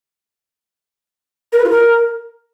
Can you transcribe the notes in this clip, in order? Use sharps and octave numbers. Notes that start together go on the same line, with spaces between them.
A#4
B4
F4
A#4